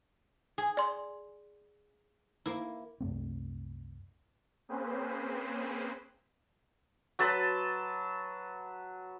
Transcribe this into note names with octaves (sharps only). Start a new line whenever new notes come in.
G#4
D5 C6
A#3 E4
C2 F#2 A3 C4
A#3 C4 C#4 G#4 B4 C5
F#3 B4 A5 C6